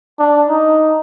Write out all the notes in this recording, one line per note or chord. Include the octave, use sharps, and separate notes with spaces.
D4
D#4